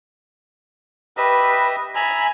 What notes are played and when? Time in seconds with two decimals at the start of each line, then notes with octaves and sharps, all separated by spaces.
1.17 G4 B4 D#5 E5
1.95 E5 G#5 A#5 B5